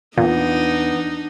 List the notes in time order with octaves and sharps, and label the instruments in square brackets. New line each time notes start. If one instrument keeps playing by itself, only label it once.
[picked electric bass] E2 [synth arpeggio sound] A#2 [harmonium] B3 [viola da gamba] D4 D#4